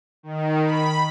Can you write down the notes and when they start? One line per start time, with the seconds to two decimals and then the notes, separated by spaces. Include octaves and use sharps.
0.23 D#3
0.64 B5